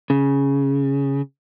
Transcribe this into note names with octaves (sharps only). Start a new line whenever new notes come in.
C#3